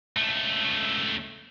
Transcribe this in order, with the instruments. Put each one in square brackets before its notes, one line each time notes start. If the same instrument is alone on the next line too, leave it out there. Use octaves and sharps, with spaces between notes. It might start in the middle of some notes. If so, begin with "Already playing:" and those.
[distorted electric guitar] C#2 A3